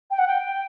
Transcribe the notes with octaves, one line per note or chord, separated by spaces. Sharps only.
G5
F#5
G5